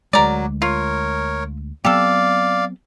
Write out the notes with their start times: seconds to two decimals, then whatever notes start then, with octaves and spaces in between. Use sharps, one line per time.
0.13 D2 F#3 G#3 A#4 D5
0.62 F4 A#4 C#5
1.85 F#3 B3 C4 G4 A4 D5 F5